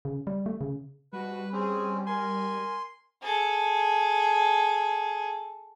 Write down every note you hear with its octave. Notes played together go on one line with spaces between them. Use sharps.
C#3
G3
A3
C#3
G#2 B2 G3 F#4 B4
C4 C#4 G#4
A#4 G#5 C6
G#4 A4